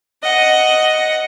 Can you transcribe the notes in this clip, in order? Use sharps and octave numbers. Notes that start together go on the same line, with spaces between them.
D#5 F#5